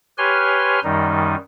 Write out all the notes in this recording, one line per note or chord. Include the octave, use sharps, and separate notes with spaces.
G4 B4 C#5 G#5 C6 F6
F#2 D#3 G3 D#4